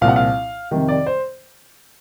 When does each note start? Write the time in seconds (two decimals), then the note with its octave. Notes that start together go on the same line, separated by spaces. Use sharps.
0.01 C2 A#2 F3 F5
0.08 F#5
0.16 F5
0.71 F2 C3 D#3
0.89 D5
1.06 C5